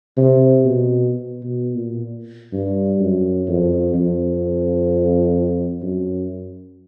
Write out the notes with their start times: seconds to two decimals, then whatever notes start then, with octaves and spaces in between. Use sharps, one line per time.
0.17 C3
0.65 B2
1.43 B2
1.75 A#2
2.53 G2
3.00 F#2
3.48 F2
3.94 F2
5.82 F#2